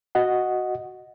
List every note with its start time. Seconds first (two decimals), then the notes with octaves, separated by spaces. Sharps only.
0.15 F#4 D#5 F#5